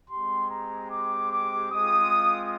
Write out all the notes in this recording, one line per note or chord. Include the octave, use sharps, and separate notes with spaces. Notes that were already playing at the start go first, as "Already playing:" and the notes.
G#3 C4 G4 C6
A#5
D6
D6
G#3 C4 F4 D#6